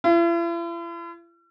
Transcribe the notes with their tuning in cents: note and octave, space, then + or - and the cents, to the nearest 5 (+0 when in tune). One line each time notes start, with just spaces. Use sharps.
E4 +45